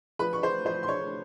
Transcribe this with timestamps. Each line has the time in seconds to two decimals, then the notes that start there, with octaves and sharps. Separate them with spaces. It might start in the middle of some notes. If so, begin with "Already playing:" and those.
0.19 F3 B4 B5
0.33 C#6
0.43 C5 C6
0.65 F3 C5 C6
0.83 C6
0.88 C#5 C#6